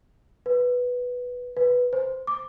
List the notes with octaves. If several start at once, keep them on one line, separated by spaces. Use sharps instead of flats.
B4
B4
C5
D6